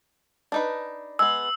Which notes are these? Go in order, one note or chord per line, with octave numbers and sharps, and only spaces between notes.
D4 D#4 B4
G#3 B3 E6